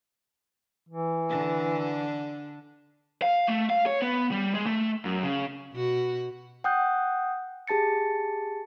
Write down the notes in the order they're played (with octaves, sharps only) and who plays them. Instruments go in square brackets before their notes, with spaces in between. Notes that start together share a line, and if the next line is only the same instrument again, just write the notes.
[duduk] E3
[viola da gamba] D3 D4
[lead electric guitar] F5
A3
F5
C#5
B3
G3
G#3
A3
F#2
C#3
[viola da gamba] B2 F#4
[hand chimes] F#5 G5 D#6 F#6 G6
G4 G#4 A5 A6 C#7